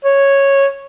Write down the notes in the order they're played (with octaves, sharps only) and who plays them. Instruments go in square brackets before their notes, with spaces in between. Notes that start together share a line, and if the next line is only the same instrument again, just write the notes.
[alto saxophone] C#5